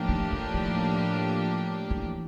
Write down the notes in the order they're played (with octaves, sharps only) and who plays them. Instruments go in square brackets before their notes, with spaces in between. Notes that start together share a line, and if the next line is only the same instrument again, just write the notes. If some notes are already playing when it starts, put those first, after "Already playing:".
Already playing: [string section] A2 F3 A#3 D4 G4
[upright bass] D#3
D3
D#3
E3